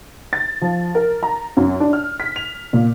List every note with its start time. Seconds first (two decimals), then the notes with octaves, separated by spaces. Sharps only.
0.33 A6
0.61 F3
0.95 A#4
1.23 A#5
1.57 F#2
1.80 D4
1.93 F6
2.20 B6
2.36 F7
2.73 A#2